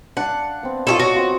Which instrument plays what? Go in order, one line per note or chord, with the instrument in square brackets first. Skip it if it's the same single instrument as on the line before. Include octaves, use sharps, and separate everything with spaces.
[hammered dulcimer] D4 D5 F5 [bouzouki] F#5
[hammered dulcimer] B3 C4
[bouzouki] F4 G#4 A4 [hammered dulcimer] D5 D#5 C#6
[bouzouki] F#4 [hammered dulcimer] C#5
[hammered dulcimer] C4 F4